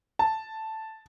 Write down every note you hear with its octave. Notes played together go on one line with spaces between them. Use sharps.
A5